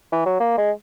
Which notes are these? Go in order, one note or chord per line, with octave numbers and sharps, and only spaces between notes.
E3
F#3
A#3
G#3